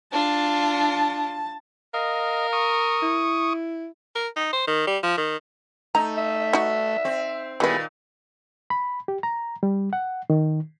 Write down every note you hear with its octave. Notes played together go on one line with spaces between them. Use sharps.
D4 F4 A5
A#4 D#5 F5
C#6 D#6
E4
A#4
D#4
C5
D#3
G3
F3
D#3
A3 D#4 A#5
E5
B3 D#4 F#4
C4
A#2 D#3 G3 B3 E4 G#4 B4
B5
G4
A#5
G3
F#5
D#3